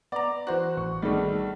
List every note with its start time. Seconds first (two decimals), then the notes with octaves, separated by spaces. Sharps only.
0.12 B3 D5 A#5 D6
0.47 E3 F#4 C5 F#6
0.77 A1 C#6
1.02 B1 D#3 G3 A3 G#4